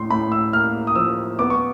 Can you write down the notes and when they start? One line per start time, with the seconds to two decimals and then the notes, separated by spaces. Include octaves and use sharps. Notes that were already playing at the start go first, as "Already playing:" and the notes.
Already playing: A2 C6
0.11 A2 B5
0.32 E6
0.53 A#3 F6
0.87 D#6
0.95 F3 E6
1.39 B3 D6
1.50 C#6